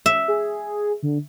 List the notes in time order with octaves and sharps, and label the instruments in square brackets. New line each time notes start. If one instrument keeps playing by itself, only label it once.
[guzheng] E5
[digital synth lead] G#4
D3